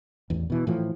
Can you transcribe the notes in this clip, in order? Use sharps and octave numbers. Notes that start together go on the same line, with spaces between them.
A1 E2
B2 E3
A2 E3 F3